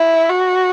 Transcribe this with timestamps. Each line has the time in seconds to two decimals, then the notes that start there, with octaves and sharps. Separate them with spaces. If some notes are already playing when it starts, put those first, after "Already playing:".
Already playing: E4
0.29 F#4